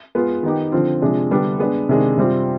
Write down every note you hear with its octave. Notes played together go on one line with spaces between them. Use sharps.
G#3 B3 F4
D#3 B3 D#4 G4
D3 F3 C4 F4
C3 F3 G#3 D4
D3 G3 B3 D4
G#3 B3 D4
C3 D#3 G#3 D4
C3 G3 C4 F4